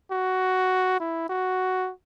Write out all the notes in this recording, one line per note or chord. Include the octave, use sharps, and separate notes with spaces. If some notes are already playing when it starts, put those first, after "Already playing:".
F#4
E4
F#4